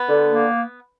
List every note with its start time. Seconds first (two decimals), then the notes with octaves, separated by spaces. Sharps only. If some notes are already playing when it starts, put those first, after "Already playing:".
Already playing: B3
0.09 D3
0.26 A#3